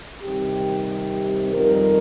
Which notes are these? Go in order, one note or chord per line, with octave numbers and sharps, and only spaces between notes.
C3 D#3 G3 C4 G4
F2 D#3 G3 A#4